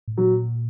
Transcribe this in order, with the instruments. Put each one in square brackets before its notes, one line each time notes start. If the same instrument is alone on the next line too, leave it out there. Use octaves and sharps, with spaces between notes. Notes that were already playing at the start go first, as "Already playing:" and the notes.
[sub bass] A2
[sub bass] A#2 [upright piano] F#3